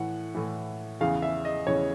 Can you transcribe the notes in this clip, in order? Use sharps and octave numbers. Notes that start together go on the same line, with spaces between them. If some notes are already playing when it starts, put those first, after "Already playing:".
Already playing: A2 E3 F#5
A2 E3
E2 C#3 E3 F5
E5
D#5
E2 C#3 E3 C#5